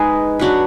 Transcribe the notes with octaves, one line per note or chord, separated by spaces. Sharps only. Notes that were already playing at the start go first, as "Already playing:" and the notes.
Already playing: G#3 D#4 G#4 B4
F#3 D4 F#4 B4